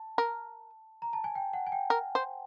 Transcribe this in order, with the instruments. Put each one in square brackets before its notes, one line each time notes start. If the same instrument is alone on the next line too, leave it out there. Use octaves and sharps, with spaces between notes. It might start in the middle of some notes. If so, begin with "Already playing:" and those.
Already playing: [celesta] A5
[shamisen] A#4
[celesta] A#5
A5
G#5
G5
F#5
G#5
G5
[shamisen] A#4
C5